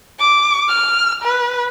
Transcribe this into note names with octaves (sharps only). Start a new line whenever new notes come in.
D6
F6
B4